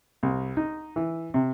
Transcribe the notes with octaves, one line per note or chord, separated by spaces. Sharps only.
C2
D#4
E3
C3